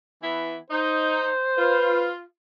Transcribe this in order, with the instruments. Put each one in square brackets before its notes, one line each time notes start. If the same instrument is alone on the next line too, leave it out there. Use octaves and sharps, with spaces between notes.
[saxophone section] E3 B3 E4
[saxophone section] D#4 [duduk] C5
[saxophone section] F4 [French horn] B4